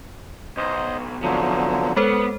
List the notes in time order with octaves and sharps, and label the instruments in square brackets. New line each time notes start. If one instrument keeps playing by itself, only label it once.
[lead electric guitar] B1 [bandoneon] C5 D#5
[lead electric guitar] C2 B2 [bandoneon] D3 F3 F#3
[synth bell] G#3 A4 C5 [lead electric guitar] B3